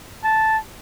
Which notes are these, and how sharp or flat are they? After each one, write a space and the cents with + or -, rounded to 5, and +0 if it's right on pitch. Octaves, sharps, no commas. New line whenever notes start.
A5 -5